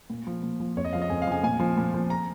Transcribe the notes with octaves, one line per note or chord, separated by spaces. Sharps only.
A#2
F3
A#2
F3
F2 C#5
D#5
C#3 F3 F5
D#5
F2 G#5
F5
C#3 F3 G#5
A#2 G#5
F3
A#2
F3
A#5